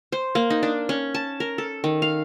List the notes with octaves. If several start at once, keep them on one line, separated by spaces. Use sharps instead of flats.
C5
A#3
D#4
D4
C#4
A5
A#4
A4
D#3
F5